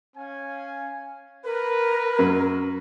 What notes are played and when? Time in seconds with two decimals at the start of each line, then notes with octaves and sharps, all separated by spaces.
0.17 C#4 F5 G#5
1.45 A#4 B4
2.19 F#2